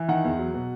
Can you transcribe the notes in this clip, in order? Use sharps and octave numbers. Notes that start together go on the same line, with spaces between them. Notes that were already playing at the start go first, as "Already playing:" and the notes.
Already playing: E3
D#3 F#5
E2
F#3
B2